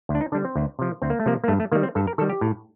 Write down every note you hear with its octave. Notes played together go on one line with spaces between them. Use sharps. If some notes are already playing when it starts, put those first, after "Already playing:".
D2
D4
D#4
D3 G3 D4
C4
D2
C3 F3
D2 C4
A#3
A3
C3 F3 A#3
A#3
G2 A3
A3
D#3 G3 A#3
C4
G2 A4
A#4
D#3 G3 A4
G4
A2